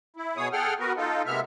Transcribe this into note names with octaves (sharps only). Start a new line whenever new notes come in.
E4
B2 B3 G#4 C#5 D#6
G#4 A4 F#5 G5 F6
B3 F#4 A#4 B4
D#4 F4 A4
C3 G#3 A#3 B3 E5 F6